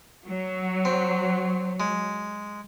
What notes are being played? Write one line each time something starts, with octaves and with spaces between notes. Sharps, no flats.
F#3
C4
G#3